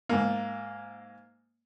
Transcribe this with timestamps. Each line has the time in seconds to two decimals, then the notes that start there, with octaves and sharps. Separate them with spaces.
0.09 G#2 A#3